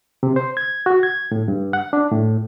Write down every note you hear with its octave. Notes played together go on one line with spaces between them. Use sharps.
C3
C5
G#6
F#4
G#6
A2
G2
F#5
D4
A2